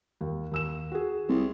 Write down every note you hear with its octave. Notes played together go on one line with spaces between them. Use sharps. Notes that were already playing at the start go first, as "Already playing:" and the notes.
D#2
D#2 E6 E7
F#4 G#4
C2